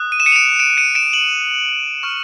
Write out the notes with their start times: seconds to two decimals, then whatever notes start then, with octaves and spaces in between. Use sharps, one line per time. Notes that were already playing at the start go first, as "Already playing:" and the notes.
Already playing: D#6 F#6
0.12 D#7
0.20 E7
0.26 C#7 D#7
0.32 F7
0.36 D7 E7
0.60 D7 E7
0.77 C#7 D#7
0.95 D7 E7
1.13 E7 F#7
2.03 C#6 F6